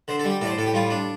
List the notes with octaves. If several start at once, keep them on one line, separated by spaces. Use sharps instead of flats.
D3 C5
A4
G3
G4
A2 A4 D5
C5
A2 A4
G4
G3 F4
D4